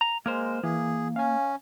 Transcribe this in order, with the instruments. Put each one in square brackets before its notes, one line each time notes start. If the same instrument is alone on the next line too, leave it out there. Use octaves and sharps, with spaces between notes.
[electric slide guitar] A#5
[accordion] G#3 [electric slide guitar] A#3 A#4 C5
[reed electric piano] E3 [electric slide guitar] A#3 [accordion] G#4
[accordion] C#4 [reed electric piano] F5 G#5